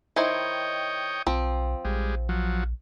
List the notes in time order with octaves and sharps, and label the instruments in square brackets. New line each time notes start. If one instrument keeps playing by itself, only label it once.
[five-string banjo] D#3 E4 C5 [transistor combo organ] C#5 D#5 G5
[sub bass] B1 [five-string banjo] F3 C4
[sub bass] A#1 [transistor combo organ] G3 G#3
[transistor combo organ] F3 F#3